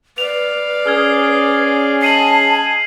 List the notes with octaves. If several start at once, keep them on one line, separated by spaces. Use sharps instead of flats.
B4 D5 F5 F7
C#4 G#4 F6 G#6
D#5 G#5 A5 C7 D#7 F#7